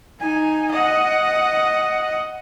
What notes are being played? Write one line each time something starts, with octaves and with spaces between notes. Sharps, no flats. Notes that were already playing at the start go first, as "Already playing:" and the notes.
D#4 G#5
D#5 F#5